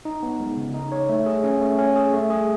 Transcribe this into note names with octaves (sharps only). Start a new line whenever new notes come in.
D#4
B3
G#3
C#3
D#4
C#5
A3
G#4
C#4
A3
C#4
G#4
A3
G#4